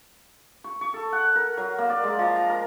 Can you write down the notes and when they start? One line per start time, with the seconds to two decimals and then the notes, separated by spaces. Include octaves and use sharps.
0.64 C#6
0.81 C#6
0.94 A4
1.13 F#5
1.36 A#4
1.57 F#3
1.78 A#3
1.90 D5
2.04 G#3
2.19 F3
2.36 A#5
2.50 A#4